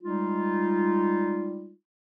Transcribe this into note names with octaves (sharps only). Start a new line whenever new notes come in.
G3 G#3 D#4 F4